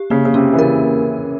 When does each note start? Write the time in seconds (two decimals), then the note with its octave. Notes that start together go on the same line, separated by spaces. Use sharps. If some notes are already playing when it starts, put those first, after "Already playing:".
Already playing: G4
0.10 C#3 A#3
0.25 C#3
0.34 C3 C#4
0.53 E3
0.59 C#3 A#4